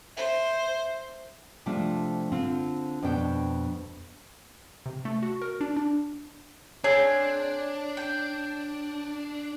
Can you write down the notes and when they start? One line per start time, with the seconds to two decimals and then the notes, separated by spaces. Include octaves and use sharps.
0.17 C5 E5
1.66 C3 F3 A3 D4 F4
2.32 D3 C4 F4
3.02 F2 B2 D4 G5
4.86 C3
5.05 A3
5.23 F#4
5.42 A#4
5.61 D4
5.77 D4
6.84 C4 D4 G#4 C#5
7.97 G5